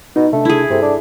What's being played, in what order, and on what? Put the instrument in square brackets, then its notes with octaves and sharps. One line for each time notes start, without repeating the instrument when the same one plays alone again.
[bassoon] B2 [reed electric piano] D#4
[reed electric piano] C3 D4 [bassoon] A3
[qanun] E4 G#4
[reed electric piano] G2 A4 [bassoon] C3
[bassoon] D4